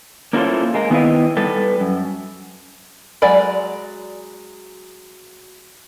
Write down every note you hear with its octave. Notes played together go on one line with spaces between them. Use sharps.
A#3 C#4 E4 F4 A4 C5
G#3 A#3
D#3 B3 C4 E4 B4 D#5
G3 A4 B4
F#2
F#3 G#3 D5 G#5 B5